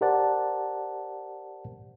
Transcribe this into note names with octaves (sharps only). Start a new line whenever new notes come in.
G4 A#4 C5 D5 F#5 A5